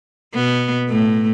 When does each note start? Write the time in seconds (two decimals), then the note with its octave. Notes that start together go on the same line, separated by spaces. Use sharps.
0.34 B2 B3
0.89 A2 A3